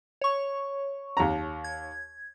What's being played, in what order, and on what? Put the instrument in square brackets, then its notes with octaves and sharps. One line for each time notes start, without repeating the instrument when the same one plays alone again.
[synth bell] C#5 C#6
[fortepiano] D#2 A#5
[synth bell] G#6